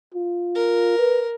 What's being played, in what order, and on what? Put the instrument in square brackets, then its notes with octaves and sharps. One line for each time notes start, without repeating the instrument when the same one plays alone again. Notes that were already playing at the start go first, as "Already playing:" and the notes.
[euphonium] F4
[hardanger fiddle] A#4
[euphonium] B4